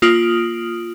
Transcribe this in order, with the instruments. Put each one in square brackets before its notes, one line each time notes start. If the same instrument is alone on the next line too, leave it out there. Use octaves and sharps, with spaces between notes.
[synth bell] A#3 F4 D#6 F6 D7 F#7